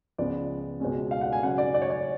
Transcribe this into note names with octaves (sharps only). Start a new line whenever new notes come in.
C#2 C#3 F3 G#3 B3 D5
C#2 B2 G#3 C#4
F5
F#5
G#5
C#3 F#3 C#4 F#5
D5
D5
C#5
D5